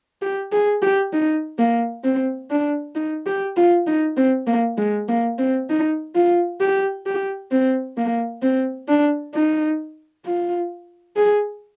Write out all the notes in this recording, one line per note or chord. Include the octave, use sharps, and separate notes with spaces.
G4
G#4
G4
D#4
A#3
C4
D4
D#4
G4
F4
D#4
C4
A#3
G#3
A#3
C4
D#4
F4
G4
G4
C4
A#3
C4
D4
D#4
F4
G#4